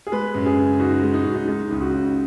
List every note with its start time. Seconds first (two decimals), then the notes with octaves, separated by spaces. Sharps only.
0.07 G#4
0.12 G#3 B4
0.35 F#2
0.46 G#4
0.57 C#3
0.80 D#4 F#4
1.03 G#3
1.14 D#4
1.25 F#2 F#4
1.35 D#4
1.47 G#3 D#4
1.71 C#2 D#4
1.81 F#4
1.92 C#3